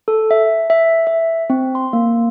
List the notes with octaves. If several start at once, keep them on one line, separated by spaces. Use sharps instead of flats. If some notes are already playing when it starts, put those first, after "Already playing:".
A4
E5
E5
E5
C4
C6
A#3